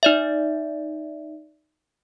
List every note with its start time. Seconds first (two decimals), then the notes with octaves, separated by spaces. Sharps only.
0.03 D#4 D5 E5